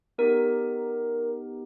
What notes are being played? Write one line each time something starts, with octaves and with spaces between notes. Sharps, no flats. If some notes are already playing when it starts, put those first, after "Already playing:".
B3 D#4 G4 A#4